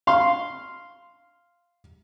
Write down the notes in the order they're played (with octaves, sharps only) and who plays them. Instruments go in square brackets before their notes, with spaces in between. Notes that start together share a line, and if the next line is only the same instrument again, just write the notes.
[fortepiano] F5 C6